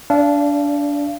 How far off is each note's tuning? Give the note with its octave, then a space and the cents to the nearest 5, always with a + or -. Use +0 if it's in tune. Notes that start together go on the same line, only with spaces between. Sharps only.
D4 -20 D5 +0 F5 -35